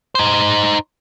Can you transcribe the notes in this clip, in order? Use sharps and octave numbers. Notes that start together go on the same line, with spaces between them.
D#4 C5